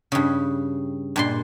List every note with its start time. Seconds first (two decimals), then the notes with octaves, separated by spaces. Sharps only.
0.12 G2 C#3
1.16 G2 A#2 C6